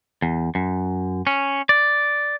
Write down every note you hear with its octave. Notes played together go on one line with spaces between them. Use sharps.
E2
F#2
C#4
D5